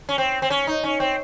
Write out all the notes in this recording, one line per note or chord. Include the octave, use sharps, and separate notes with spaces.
C#4
C4
C4
C#4
D#4
C#4
C4